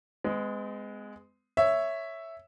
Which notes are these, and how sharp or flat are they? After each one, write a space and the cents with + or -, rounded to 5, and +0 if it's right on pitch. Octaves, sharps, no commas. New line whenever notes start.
G#3 +0 B3 +45
C#5 +0 E5 +0